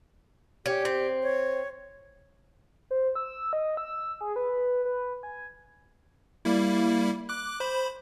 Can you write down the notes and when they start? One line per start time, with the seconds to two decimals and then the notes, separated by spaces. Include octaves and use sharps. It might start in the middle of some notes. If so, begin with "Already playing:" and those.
0.66 C#4 G4
0.85 C4
1.23 C#5
2.91 C5
3.15 E6
3.53 D#5
3.77 E6
4.21 G#4
4.36 B4
4.85 B4
5.23 G#5
6.45 G3 A#3 E4
7.29 D6 F#6
7.60 C5 B5